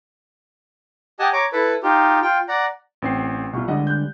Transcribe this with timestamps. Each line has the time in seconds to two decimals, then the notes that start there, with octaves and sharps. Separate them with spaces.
1.19 G4 D#5 F#5 G#5 A5
1.33 C#5 A#5 D6
1.53 E4 A4 B4
1.83 D#4 F4 G4
2.22 F4 G5
2.48 D5 F#5 A#5
3.02 A1 C4 C7
3.53 C2 B2 F4 C#6
3.68 D3 G3 G#3 D#5 F#5
3.87 F#6 G6